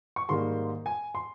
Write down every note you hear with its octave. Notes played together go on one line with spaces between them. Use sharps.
C#6
G#2 D#3 G3 A#3 C6
G#5
C6